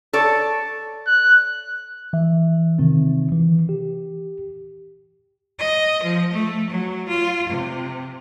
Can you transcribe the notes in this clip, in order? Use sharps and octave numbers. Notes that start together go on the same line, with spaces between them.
A4 C#5 D5
F#6
E3 E5
C3 D#3 C4
E3
G4
D#5
F3
A3
F#3
F4
C3